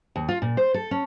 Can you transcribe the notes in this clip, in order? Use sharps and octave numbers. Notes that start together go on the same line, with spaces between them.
D#2
F4
A#2
C5
A4
C#4